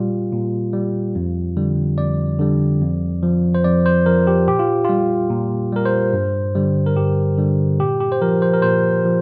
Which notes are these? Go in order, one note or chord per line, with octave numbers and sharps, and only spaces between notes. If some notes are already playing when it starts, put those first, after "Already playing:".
Already playing: A#2 G3 F4
A#2
G3
F2
D3 G3
F2 D5
D3 G3
F2
F3
C5
F2 D5
C5
F3 A#4
G4
A#2 G4
F4
G3 F4
A#2
G3 A#4
C5
G2
D3 G3
A#4
G2 G4
D3 G3
A#2 G4
G4
C5
F3 A#4
C5
A#4
A#2 C5
F3